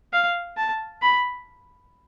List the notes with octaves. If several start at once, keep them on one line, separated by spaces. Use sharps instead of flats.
F5
A5
B5